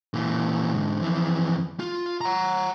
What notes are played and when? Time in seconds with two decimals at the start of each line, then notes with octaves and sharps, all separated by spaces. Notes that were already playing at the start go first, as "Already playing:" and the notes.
0.14 A#2 E3
0.74 G#2 D3
1.01 F2 E3
1.80 F4
2.21 F#5 A#5